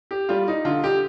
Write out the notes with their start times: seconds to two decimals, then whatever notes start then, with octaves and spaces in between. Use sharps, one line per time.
0.11 G4
0.29 G3 F4
0.48 D#4
0.65 D3 F4
0.84 G4